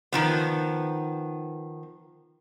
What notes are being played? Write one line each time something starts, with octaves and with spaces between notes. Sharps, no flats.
D#3 F3 B3